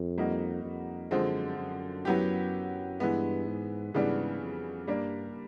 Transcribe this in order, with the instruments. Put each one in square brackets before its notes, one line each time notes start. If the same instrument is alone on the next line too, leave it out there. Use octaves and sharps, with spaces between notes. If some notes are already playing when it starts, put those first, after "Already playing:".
Already playing: [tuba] F2
[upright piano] G3 A#3 D#4 F#4
[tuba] F2
[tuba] F#2 [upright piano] D3 F3 G#3 C4
[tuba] F#2
[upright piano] F#3 B3 E4 G4
[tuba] G2 [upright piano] E3 G#3 B3
[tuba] G#2
[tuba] G#2 [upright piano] C#3 E3 G3 B3 D4
[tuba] F2
[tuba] G2 [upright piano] G3 A#3 D4